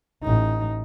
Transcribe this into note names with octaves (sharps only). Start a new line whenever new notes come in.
A1 D#4